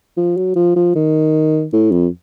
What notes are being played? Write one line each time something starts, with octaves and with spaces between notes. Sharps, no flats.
F3
F#3
F3
F3
D#3
A2
F2